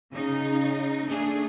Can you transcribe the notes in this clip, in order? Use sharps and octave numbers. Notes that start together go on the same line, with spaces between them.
C#3 D#4
A3 D4 G#4